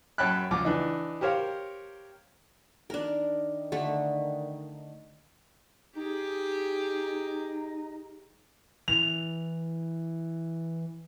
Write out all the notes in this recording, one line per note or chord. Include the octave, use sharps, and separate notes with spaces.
F#2 C#5 G5 A5 B5 F#6
C#2 F3 D6
E3 D4 D#4
G4 A#4 C5 C#5 F5
D#3 D4 D#4 A#4
D3 A3
D#4 G4 G#4
E3 F7